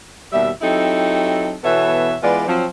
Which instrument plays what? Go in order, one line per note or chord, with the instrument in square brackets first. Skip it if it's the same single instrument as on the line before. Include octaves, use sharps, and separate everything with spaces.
[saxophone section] D#2 B2 G3 E5
F#3 C4 D#4 E4 G4 A4
B2 E3 B3 A4 C#5 E5
E3 G#3 B3 F4 D5
F3 F#3 C4